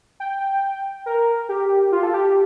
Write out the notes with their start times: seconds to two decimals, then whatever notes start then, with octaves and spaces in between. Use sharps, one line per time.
0.20 G5
1.06 A#4
1.49 G4
1.92 F4
2.03 A4
2.14 G4